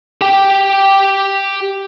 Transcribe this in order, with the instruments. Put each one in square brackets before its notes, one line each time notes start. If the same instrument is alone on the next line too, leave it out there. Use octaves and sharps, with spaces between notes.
[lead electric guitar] G4 G5